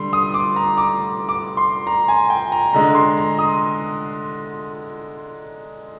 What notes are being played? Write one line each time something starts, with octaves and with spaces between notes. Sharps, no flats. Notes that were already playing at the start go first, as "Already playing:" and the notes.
Already playing: D3 G3 C6
D#6
D6
A#5
D6
D6
C6
A#5
G#5
G5
A#5
D3 G#3 A#5
C6
A#5
D#6